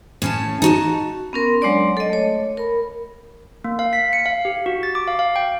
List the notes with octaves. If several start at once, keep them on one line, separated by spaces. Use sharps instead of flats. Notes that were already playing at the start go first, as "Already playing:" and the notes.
A2 C#4 A5
D#4 F#4 A5
B3 C#4 A#4 C6
F#3 G#3 D4 C#5 D5 C6
A4 D#5
A3 C#5
A#4 B5
A#3
F5
B6
C#7
F5
G4
F#4
A6
D6
F5
F5
G5